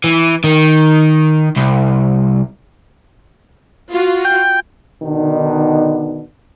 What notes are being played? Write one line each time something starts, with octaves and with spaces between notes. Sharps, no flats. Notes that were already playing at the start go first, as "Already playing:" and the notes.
E3
D#3
C2
F4 F#4
G5
B2 D3 D#3 B3 D4 D#4